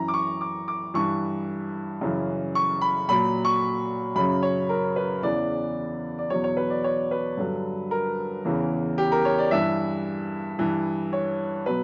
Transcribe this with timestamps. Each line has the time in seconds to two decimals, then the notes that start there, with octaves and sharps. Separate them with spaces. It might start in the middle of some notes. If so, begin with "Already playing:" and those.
Already playing: F#2 E3 A#5
0.08 D6
0.14 C#6
0.41 D6
0.68 D6
0.94 G2 E3 C#6
2.01 F#2 C#3 E3
2.55 C#6
2.81 B5
3.09 A#2 F#3 B5
3.45 C#6
4.16 F#2 C#3 F#3 B5
4.43 C#5
4.69 A#4
4.96 B4
5.23 E2 C#3 E3 D5
6.18 D5
6.30 E2 B2 F#3 C#5
6.44 C#5
6.57 B4
6.70 D5
6.84 C#5
7.11 B4
7.37 G2 D3 F#3
7.91 A#4
8.45 E2 C#3 E3
8.98 G4
9.12 A#4
9.25 C#5
9.38 D5
9.51 G2 E3 E5
10.59 G2 E3
11.13 C#5
11.66 B2 F#3 B4